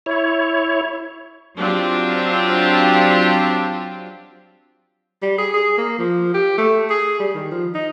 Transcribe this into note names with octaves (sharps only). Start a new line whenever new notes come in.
E4 C#5
F#3 C4 D4 F4 G4
G3
G#4
G#4
A#3
F3
G4
A3
G#4
G3
D#3
F3
D#4